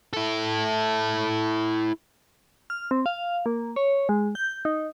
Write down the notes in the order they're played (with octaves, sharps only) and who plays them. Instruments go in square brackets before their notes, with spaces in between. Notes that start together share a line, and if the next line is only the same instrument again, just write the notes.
[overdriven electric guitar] E4 A4
[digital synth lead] F6
C4
F5
A#3
C#5
G#3
G6
D#4